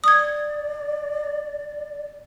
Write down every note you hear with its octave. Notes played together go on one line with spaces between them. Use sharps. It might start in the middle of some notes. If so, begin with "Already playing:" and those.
D5 D#6 G#6